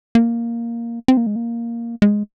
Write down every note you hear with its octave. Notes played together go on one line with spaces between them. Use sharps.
A#3
C4
A#3
G#3
A#3
G#3